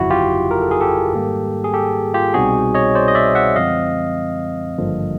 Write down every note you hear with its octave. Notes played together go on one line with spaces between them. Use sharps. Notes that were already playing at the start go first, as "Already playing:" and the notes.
Already playing: G1 F2 C#3 F#3 E4 F#4
F4 G4
A#4
A4
G#4
G4 A4
G#2 D#3 G3 A#3
G#4
G4 A4
F4 G4
C2 B2 G3 C4 D#4 F#4 G#4
C#5 D#5
C5 D5
D#5
D5 E5
E5 F#5
F#2 D3 F3 G#3 C4 D#5 F5
G#1 G2 D3 F3 A#3